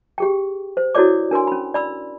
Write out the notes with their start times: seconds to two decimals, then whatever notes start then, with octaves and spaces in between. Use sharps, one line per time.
0.18 G4 G#4 G5
0.77 C5
0.95 E4 F#4 A4 C#5 D5 D6
1.31 D4 A#4 G#5 C6
1.47 C#4 B5
1.74 D5 B5 E6